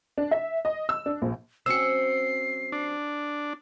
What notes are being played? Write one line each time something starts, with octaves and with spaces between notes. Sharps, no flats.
D4
E5
D#5
E6
D4
A#1
F#3 C4 C#4 E6 C7 C#7
D4